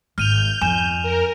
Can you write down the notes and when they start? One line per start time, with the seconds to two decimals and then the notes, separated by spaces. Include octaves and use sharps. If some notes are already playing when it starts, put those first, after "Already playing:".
0.18 G#1 F6 G6 D#7 F7
0.61 F2 G#5 E7
1.03 A#4